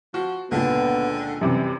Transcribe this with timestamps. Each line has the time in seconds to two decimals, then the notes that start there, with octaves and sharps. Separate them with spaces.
0.14 F3 F#4
0.51 C#2 A#2 D3 B3
1.41 F#2 C3 E3 G3